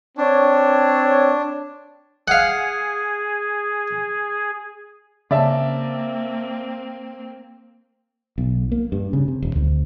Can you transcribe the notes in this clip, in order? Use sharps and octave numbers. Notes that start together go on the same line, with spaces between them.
C4 D4 C#5
G#4 F5 F#5
C#3 A#3 C4 D5 E5 A5
B1
A#3
G2
C#3
C3
D#1
D2